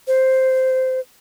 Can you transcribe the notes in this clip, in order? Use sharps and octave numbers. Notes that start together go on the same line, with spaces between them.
C5